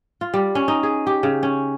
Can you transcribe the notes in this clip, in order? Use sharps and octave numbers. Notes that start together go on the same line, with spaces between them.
F4
G3
C#4
D#4
G#4
G4
C#3
C#4